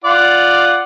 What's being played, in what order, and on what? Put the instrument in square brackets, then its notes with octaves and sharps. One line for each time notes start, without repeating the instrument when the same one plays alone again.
[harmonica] F4 D5 F#5